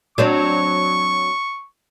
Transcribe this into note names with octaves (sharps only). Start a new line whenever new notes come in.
F#3 C4 D4 C#6